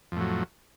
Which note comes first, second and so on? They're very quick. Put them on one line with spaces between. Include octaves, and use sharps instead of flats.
F2 A2 F#3